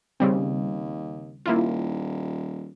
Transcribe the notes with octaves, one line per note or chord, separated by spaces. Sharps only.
D#2 C#3 G3 C4
D#1 A#3 E4 F4